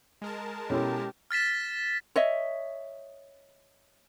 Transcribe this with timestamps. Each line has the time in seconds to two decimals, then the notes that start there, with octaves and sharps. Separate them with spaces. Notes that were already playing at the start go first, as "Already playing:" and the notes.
0.22 G#3 A#4 A5
0.70 B2 C#4 E4 G4 A4 C#5 C6
1.31 F6 A6 B6 E7
2.16 C#5 D#5 E5